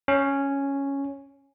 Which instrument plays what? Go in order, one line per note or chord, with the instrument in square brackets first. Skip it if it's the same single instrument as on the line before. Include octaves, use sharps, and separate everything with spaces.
[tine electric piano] C#4